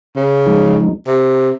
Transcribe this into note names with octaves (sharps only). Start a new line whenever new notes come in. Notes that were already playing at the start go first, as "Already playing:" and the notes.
C#3
F3 G#3 D#4
C3